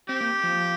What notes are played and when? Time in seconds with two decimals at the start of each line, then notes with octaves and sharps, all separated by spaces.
0.09 C4 G4
0.21 A#3
0.43 F3